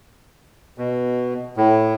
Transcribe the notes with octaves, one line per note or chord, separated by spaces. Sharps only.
B2
A2